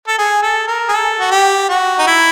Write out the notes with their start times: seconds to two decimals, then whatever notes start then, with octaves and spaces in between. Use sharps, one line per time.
0.08 A4
0.18 G#4
0.42 A4
0.68 A#4
0.89 G#4
0.93 A4
1.20 F#4
1.31 G4
1.69 F#4
1.99 D#4
2.07 E4